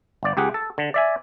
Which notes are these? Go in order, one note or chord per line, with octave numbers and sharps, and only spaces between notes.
G1 D5
C#2 G4 G#4 F#5
A4
D3
D5 E5 G#5